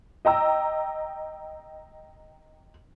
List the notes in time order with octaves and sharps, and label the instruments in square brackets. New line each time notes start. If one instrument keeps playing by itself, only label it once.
[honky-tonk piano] D#5 G5 A#5 E6